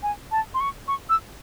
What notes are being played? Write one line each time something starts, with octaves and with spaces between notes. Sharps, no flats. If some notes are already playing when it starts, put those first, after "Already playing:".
G#5
A5
C6
C#6
C#6
E6